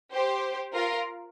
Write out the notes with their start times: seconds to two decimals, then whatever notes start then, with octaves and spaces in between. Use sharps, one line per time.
0.12 G4 C5
0.73 F4 A#4